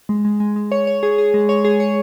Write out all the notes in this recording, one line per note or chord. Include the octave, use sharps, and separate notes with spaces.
G#3
G#3
G#3
G#3
C#5
C#5
G#4
G#4
G#3
C#5
G#4
C#5